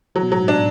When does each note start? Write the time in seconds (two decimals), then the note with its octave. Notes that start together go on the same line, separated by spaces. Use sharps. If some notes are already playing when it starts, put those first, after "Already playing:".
0.15 E3 F#3
0.23 B2
0.31 A2 F#3
0.40 G#2
0.48 D4